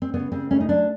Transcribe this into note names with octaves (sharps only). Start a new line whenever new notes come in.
C4
C#3 B3
C#3 C4
A3 C#4
D#4
F#3 D4